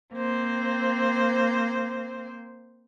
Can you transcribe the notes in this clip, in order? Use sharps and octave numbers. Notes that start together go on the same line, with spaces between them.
A#3 C4 C5